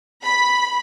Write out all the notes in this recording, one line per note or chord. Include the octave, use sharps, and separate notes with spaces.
B5